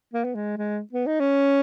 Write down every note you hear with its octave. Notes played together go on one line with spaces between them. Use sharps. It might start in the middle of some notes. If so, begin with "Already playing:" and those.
A#3
B3
G#3
G#3
B3
D#4
C#4